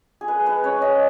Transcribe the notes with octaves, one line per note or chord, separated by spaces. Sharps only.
G#4
G#3 B4
G#3 B4
C#4 C#5
G#3 D#5